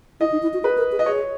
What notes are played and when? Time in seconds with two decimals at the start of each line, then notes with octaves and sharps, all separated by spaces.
0.20 E4 D#5
0.32 D#4
0.42 E4
0.53 F#4
0.63 G#4 B4
0.77 A#4
0.92 G#4
0.99 D#5
1.06 G#4 C#5